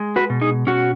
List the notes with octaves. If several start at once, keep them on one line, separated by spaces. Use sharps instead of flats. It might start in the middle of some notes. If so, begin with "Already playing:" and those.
Already playing: G#3
F#4 B4
B2
D#4 G#4
B2 C#4 F#4